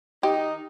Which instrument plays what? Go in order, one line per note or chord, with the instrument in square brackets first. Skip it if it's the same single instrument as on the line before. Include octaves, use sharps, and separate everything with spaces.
[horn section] D#3 D#4 [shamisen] G4